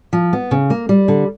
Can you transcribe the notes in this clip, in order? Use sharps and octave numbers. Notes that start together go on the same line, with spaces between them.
F3
B3
C#3
A#3
G3
D3